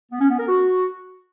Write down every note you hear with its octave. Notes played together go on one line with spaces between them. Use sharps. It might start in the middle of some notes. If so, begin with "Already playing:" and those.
B3
C#4
B3
A#4
F#4